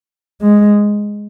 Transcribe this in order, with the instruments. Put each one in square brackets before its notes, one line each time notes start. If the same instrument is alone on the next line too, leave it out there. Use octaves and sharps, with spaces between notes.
[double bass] G#3